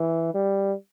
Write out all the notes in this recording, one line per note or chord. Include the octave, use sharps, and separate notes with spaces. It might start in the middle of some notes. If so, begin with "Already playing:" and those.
Already playing: E3
G3